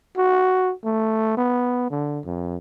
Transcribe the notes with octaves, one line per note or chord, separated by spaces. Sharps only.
F#4
A3
B3
D3
F2